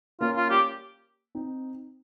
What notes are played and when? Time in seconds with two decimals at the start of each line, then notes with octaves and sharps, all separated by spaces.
0.21 A#3 C#4 F4
0.36 F4
0.50 G4
1.35 C4 D#4